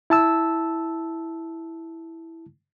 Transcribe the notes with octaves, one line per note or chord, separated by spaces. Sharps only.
E4 A5 E6